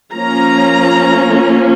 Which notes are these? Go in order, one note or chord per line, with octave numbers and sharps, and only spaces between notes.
F3 A#3 C#4 A#5